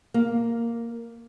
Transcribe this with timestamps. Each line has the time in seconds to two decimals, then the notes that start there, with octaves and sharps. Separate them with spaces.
0.14 A#3